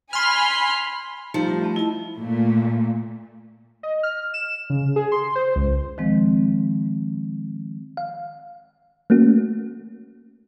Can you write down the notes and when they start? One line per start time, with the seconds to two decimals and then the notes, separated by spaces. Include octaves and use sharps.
0.13 G#5 B5 C6 F6
1.34 F3 G3 A3 D#4 G4 A4 C5 A#5
1.48 E5 D#6
1.62 E5 A5 B5
1.76 E4 D#5 A5
2.17 A#2 A3
3.83 D#5
4.03 F6
4.34 E7
4.70 C#3
4.96 G#4
5.12 C6
5.35 C5
5.56 C#2
5.98 D#3 F3 G#3 C4
7.97 F5
9.10 A3 A#3 C#4 F#4